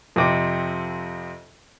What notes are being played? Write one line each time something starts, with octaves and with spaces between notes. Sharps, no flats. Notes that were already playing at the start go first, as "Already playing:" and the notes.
F2 C3 D6